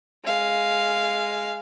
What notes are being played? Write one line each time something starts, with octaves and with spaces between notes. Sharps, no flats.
G#3 F5